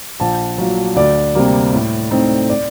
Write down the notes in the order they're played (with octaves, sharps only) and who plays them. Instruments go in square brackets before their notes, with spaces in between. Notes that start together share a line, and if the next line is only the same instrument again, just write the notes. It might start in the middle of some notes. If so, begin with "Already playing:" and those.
[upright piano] A#1 A5
A#2 F#3
D2 D5
C3 G3 A#3
A2
A3 C4 D#4
D5